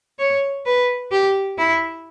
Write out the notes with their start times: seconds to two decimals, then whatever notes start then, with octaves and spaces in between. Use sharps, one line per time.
0.19 C#5
0.66 B4
1.11 G4
1.58 E4